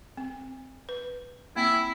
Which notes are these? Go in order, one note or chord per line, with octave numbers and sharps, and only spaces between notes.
C4
B4
A#3 C4 E4